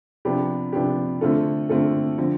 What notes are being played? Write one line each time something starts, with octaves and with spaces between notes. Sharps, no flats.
C3 F3 B3 D4 G4
C3 F3 B3 D4 G4
D3 A3 C4 F4 A4
D3 A3 C4 F4 A4
D3 F3 C4